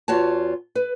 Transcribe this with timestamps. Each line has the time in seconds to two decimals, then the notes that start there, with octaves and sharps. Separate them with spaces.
0.08 E2 F4 F#4 C#5 A5
0.75 B4